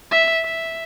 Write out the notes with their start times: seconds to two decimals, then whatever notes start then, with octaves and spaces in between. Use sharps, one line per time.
0.11 E5
0.44 E5